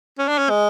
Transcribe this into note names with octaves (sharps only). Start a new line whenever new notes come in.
C#4
D4
C#4
G#3